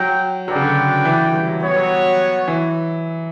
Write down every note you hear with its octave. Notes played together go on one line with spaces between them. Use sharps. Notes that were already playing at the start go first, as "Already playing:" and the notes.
Already playing: F#3 G5
F#3 D4 F#4 B4 D5 G5
C#3
D3
E3
G3
F#3
G3 B3 F#4 C#5
F#3
E3